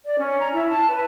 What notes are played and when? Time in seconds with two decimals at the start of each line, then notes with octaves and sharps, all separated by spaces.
0.04 D5
0.19 C#4
0.39 A#5
0.53 E4
0.69 A5
0.90 B4